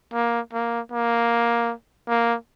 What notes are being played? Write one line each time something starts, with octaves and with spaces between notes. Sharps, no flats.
A#3
A#3
A#3
A#3